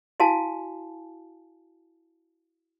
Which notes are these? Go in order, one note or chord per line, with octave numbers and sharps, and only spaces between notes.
E4 F#4 F5 G#5 A5